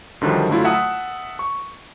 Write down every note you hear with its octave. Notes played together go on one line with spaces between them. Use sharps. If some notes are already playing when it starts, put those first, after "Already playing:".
F#2 D3 D#3 F3 G3
D3 F#3 A3 E4 F4
E5 F#5 A5 D#6 E6
C#6